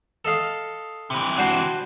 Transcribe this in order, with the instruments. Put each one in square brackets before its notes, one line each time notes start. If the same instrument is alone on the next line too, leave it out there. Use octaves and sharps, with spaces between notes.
[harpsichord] A4 D#5 F5
[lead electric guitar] C3 E3
[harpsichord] D4 F#4 C5